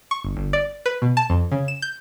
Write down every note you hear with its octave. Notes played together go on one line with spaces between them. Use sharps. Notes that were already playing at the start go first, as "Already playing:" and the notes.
C#6
G1
G1
D5
B4
B2
A5
F2
C#3
E7
G6